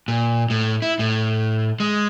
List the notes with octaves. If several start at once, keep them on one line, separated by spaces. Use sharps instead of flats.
A#2
A2
E4
A2
G#3